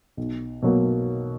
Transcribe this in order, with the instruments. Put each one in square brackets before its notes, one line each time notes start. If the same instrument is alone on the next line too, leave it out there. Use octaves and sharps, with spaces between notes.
[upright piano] B1
B2 F#3 A#3